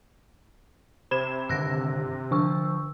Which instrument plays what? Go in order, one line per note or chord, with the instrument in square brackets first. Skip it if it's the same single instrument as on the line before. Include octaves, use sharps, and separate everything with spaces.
[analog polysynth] C3 [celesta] C5 [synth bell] B5 G#6 E7
[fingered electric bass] G2 D3 D#3 [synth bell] E6 F#6 A#6
[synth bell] D3 C#6 E6 [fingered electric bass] F3 [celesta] D4